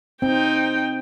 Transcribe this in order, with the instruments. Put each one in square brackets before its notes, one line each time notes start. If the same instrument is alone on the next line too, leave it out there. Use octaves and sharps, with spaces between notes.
[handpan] C4 [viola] D#4 G5